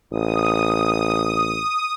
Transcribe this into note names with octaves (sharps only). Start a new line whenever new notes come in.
A1 D#6